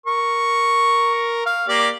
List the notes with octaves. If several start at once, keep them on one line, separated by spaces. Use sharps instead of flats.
A#4 C#6
F5
A#3 G4 D5